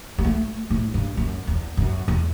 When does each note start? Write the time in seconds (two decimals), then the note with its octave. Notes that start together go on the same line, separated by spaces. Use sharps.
0.18 G3
0.25 A3
0.70 A2
0.94 G2
1.17 F#2
1.47 E2
1.77 F#2
2.08 E2